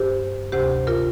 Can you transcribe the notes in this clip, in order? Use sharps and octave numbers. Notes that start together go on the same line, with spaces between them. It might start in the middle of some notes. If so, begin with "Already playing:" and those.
Already playing: G2 G4 C5
D2 C3 G4 C5
F4 A#4